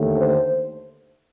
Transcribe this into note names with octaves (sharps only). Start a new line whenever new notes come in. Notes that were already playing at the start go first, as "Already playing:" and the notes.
Already playing: D#2 D3 A3
C5